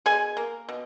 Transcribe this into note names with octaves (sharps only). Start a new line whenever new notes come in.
B2 G#4 G#5
A#3
B2